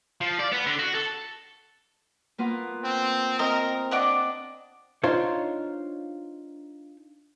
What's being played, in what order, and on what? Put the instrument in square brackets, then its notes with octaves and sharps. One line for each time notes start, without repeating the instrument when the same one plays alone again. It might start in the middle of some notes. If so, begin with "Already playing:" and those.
[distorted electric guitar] F3
D5
B3
D3
F#4
A4
[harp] A#3 B3 F4
[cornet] C4
[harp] C4 [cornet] A#4 [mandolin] D#5
[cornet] D4 [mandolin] D#5 F#5 D6
[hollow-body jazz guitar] D4 D#4 F4 C5 C#5